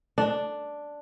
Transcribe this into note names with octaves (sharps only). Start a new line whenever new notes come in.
D4